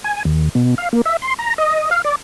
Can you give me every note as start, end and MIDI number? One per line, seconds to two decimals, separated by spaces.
0.04 0.23 80
0.25 0.49 39
0.55 0.75 47
0.78 0.89 77
0.93 1.01 58
1.06 1.17 76
1.22 1.34 84
1.39 1.54 82
1.58 1.90 75
1.91 2.02 77
2.04 2.15 74